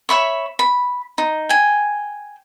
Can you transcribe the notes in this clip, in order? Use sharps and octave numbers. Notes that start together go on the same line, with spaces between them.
C#5 E5 B5 C#6
B5
D#4
G5 G#5